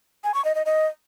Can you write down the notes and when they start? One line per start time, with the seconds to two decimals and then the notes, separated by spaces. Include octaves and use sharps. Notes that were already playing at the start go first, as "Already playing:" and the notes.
0.24 G#5
0.34 C#6
0.45 D#5
0.55 D#5
0.66 D#5